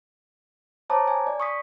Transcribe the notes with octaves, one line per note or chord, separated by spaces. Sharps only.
C5 C#5 A5 A#5 D6 D#6
G#5
D5
C#6 D#6 B6